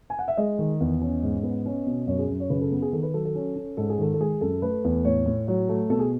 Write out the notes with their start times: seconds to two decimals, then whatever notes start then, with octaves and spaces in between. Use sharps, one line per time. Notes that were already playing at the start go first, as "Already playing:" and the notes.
0.10 G#5
0.19 F#5
0.28 E5
0.37 G#3 D#5
0.59 D#3
0.80 E2
1.01 C#4
1.23 G#2
1.43 B3
1.66 C#4
1.87 B2
2.07 F#2 C#5
2.19 G#4
2.28 F#2
2.40 C#5
2.50 C#3 B4
2.61 A4
2.72 B3
2.82 G#4
2.93 D#3 A4
3.03 B4
3.14 F#3 A4
3.25 A4
3.35 C#4
3.56 C#4
3.77 G#2 A4
3.90 G#4
3.99 D#3 A4
4.14 A4
4.20 G#3 G#4
4.41 F#2 A4
4.62 A3 B4
4.84 E2
5.05 A2 C#5
5.26 A2
5.47 F#3 C#5
5.69 A3
5.90 B2 A4
5.99 G#4